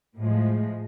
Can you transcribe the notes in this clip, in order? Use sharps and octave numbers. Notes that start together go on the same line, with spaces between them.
A2 F3 G#3